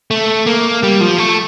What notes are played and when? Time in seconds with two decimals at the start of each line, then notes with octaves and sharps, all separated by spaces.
0.11 A3
0.46 A#3
0.83 G3
1.01 F3
1.18 A3